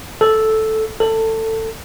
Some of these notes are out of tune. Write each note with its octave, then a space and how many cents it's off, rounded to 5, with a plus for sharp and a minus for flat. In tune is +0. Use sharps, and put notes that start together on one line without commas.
A4 -5
A4 +20